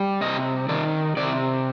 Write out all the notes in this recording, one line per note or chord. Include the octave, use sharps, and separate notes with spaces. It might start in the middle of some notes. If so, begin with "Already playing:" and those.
Already playing: G3
C3 D#5
D#3 D5
C3 D5